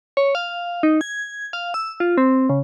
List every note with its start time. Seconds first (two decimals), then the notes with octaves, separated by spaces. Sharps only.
0.17 C#5
0.35 F5
0.83 D#4
1.01 G#6
1.53 F5
1.74 E6
2.00 F4
2.17 C4
2.49 C#3